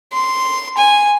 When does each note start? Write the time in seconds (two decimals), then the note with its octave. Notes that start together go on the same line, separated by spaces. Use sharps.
0.13 C6
0.78 G#5